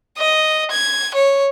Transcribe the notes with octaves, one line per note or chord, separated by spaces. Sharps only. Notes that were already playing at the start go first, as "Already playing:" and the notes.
D#5
G#6
C#5